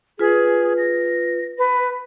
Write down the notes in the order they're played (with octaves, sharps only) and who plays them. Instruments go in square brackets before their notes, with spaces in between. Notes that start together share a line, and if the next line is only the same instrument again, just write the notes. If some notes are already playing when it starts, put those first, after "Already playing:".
[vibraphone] F4 B4 [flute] G#4
[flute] A#6
B4